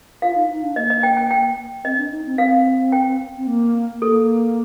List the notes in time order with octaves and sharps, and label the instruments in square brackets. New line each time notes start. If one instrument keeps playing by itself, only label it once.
[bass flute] F4 [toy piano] F5
[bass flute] D#4
D#4
D4
[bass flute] A#3 [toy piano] D#5
[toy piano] D#5
G5
G5
G5
[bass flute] C4 [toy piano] D#5
[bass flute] D4
D#4
C4
[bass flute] C4 [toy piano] F5
[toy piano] G5
[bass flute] C4
A#3
[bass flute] A#3 [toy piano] A4